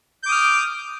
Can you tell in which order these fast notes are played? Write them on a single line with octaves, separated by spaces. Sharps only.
G6 D6 D#6 F6